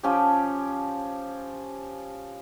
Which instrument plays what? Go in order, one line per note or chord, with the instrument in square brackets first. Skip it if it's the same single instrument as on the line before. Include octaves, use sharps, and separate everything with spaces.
[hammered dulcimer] F3 C#4 G4